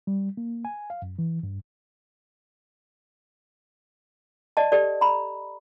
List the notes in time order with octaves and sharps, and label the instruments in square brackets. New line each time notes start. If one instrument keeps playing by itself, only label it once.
[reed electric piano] G3
A#3
G#5
F5
F#2
E3
G2
[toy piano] D5 D#5 A5
G4 A4 D5
A#5 B5